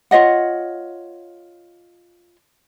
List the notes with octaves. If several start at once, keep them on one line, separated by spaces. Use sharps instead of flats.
F4 C#5 D#5 F#5